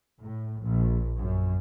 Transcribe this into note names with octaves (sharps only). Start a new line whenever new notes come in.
A2
A#1
F#2